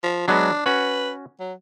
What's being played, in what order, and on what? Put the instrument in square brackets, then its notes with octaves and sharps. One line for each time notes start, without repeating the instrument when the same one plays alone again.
[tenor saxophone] F3
[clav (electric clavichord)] F#3 G#3 B3 [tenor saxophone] D4
[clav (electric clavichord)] C#4 F#4 F#5 [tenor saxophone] B4
[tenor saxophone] F#3